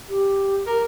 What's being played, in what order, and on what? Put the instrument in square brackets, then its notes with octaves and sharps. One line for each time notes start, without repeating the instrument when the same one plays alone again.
[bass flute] G4
[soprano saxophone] A#4